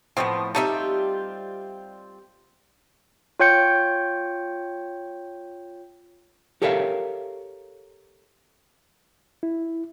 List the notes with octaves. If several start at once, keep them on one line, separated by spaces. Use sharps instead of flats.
A2 F3 B3 C4 D#5
G3 A3 C4 D#4 F4 E5
F4 C#5 G5 G6 C#7
G4 A4 A#4 C#5 E5 F5
E4